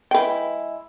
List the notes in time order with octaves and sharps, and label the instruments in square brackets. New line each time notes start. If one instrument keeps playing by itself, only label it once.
[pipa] G#3 E4 [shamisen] B4 G5